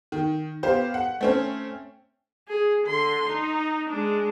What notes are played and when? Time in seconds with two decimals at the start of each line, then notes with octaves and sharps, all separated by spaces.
0.12 D#3
0.63 B3 G4 C5 F5
0.94 F#5
1.21 A3 C4 C#4
2.48 G#4
2.85 D3 C6
3.28 D#4
3.90 G#3 D4